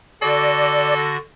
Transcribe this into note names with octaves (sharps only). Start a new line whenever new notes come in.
D3 F#4 A4 D5 A#6